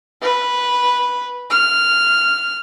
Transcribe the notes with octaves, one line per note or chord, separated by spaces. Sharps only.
B4
F6